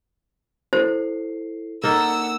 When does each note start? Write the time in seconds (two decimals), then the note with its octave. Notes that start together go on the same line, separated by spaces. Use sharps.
0.73 E4 A4 C5 C7
1.83 A#3 D#4 A4 F#5 E6